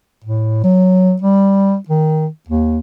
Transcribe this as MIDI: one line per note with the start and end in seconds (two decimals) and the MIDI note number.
0.24 0.61 45
0.64 1.16 54
1.21 1.77 55
1.88 2.28 51
2.48 2.79 39